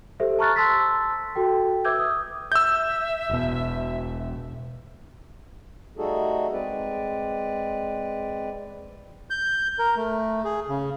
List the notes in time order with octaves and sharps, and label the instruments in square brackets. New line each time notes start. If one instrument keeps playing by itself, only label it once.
[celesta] G4 A4 C5 E5
A5 A#5 C#6 F6 F#6 A6
A5 C6 E6 A6 B6
F#4 A4 G5
B4 E5 D6 E6 G6 G#6
D#6
[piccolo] E5 [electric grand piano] E6 G6
[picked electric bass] E1 B2
[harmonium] G3 A3 D#4 F#4 G#4 A4
G#3 C4 B4 D5
[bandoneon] G6
A#4
A3
G#4
C#3